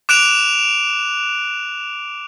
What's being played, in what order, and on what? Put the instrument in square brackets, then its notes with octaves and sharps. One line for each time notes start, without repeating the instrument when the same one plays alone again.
[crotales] D6 F#6 D7 E7 F7